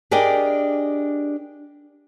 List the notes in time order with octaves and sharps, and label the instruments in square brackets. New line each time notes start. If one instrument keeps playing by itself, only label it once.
[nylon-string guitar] D4 G4 G#4 A#4 D5 D#5